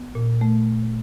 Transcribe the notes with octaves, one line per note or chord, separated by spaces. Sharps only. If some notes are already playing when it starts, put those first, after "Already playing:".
Already playing: B3
A#2
A3